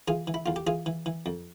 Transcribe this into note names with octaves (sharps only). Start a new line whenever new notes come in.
E3 F4 G#4
E3
E4
E2 F4
G4
E3 F4 G#4
E3
E3
F2